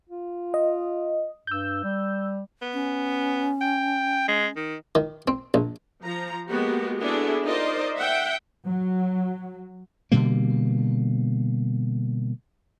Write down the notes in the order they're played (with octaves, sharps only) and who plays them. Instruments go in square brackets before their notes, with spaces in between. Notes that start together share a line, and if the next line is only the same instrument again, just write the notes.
[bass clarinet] F4
[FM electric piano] D#5
[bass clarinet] G2 [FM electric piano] E6 G6
[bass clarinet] G3
[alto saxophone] B3
[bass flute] C#4
[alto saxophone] G5
G#3
D#3
[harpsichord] D#3
C4
A#1
[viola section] F3 A#5
G#3 A#3 B3 F#4 G4
B3 D4 E4 F#4 G#4 A4
D#4 F4 A#4 C5 D5 D#5
E5 F#5 G5
[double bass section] F#3
[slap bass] B2 D3 G3 A#3